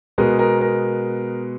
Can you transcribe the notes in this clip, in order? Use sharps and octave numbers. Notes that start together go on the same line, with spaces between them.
B2 G#3 B3 A#4
A#4
A#4